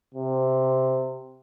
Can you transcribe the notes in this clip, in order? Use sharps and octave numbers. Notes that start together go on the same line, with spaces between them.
C3